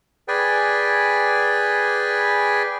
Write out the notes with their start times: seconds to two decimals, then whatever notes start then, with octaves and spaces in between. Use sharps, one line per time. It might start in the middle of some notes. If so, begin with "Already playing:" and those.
0.28 G#4 B4 D5 G5 G#5